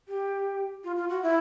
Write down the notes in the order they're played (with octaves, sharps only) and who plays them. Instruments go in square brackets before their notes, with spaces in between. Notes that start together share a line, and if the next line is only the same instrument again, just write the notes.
[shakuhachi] G4
F4
F4
F#4
E4